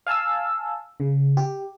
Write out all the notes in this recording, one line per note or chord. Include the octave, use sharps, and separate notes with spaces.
F5 G#5 A5 E6
C#3
G4